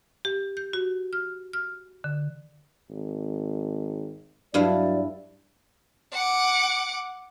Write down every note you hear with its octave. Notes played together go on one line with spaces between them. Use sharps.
G4
G6
F#4
F6
F6
D3
G#1
G2 F#3 E4 D5 F5
F#5 D6